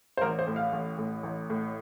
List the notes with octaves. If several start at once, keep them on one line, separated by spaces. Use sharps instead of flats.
C5
A1 A#4
C5
A2
F5
A1
A2
A1
A2